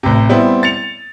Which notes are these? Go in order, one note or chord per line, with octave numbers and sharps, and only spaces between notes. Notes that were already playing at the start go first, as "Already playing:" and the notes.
A1 C3
G3 B3 C4 E4
A6 C#7 F7